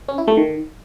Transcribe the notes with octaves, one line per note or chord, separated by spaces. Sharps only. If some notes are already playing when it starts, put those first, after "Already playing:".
C#4
E4
A3
D#3